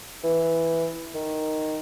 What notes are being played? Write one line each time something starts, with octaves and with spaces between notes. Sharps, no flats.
E3
D#3